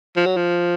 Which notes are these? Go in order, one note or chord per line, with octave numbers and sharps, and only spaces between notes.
F3
F#3
F3